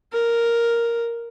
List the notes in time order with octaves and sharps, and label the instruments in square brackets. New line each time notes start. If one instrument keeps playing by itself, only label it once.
[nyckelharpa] A#4